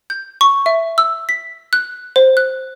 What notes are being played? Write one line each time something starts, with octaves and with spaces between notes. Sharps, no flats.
G6
C#6
E5
E6
B6
F#6
C5
F#6